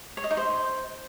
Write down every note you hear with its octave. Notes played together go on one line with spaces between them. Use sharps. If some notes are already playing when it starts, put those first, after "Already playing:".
C#5
D#5
D#4
C5